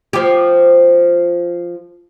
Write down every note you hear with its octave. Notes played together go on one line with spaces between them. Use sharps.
F3 G4